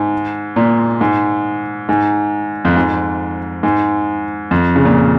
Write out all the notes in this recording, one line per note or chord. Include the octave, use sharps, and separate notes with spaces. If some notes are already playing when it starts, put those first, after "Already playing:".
Already playing: G#2
A#2
G#2
G#2
F2
G#2
G#2
F2
C#3
A#2